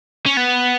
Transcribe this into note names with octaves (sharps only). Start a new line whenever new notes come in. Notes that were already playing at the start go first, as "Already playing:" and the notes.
C#4
B3